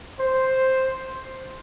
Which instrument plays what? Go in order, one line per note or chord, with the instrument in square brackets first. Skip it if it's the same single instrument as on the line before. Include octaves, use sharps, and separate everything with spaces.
[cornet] C5